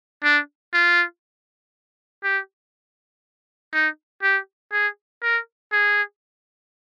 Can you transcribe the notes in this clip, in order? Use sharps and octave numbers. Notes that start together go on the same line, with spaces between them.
D4
F4
G4
D#4
G4
G#4
A#4
G#4